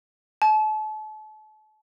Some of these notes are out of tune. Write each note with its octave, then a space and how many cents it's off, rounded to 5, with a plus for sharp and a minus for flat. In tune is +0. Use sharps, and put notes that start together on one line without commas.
A5 -35